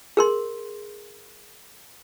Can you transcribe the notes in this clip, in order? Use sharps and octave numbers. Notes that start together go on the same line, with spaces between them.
G#4 A#4 C6